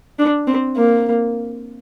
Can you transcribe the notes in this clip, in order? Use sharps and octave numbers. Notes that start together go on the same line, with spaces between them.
D4
C4
A#3